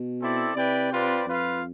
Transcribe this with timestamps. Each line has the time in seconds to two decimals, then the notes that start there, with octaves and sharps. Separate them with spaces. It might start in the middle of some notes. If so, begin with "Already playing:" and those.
Already playing: B2
0.20 C4 E4 A4 D5
0.55 C3 E4 B4 D5 G5
0.91 C4 F4 B4 D5
1.26 F2 F4 B4 F5